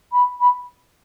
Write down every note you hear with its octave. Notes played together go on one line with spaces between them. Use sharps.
B5
B5